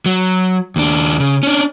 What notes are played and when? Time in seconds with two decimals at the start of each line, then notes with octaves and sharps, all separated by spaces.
0.06 F#3
0.76 D#2 D4
1.20 C#3
1.43 C#4 D4